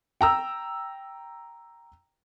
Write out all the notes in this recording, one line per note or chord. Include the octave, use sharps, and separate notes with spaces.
G5 A#5 E6